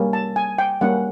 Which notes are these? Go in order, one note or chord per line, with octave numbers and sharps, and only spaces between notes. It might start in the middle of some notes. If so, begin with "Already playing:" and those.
Already playing: G3 A#3 C#4
A5
G#5
G5
G3 A#3 C#4 F#5